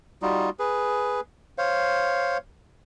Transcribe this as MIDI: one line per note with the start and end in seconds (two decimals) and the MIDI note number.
0.22 0.50 55
0.22 0.50 63
0.22 0.50 65
0.22 0.50 66
0.59 1.20 68
0.59 1.20 71
1.58 2.38 72
1.58 2.38 73
1.58 2.38 77